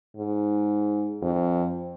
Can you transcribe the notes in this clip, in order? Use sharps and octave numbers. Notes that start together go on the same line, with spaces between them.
G#2
F2